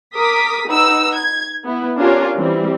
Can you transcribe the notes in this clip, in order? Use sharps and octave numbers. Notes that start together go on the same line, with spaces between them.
A#4 D6 D#6 B6
D#4 B4 F#5 E6
G#6
B3 E4
C#4 D4 F4 G4 A#4 C#5
E3 G3 C4